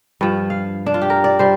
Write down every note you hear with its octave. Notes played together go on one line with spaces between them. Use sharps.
G2 F3
F5
D4
F4
G4
A#4
D5
G3 C5